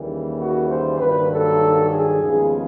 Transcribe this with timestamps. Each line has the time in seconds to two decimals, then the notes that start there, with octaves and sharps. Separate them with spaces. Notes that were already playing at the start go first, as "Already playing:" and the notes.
Already playing: D#2 C#3 E3 G3 A#3
0.39 F#4
0.69 C5
0.99 G2 D#3 F#3 A#3 B4
1.30 A4
1.90 G#4
2.20 D#2 C#3 F3 G#3 B3 G#4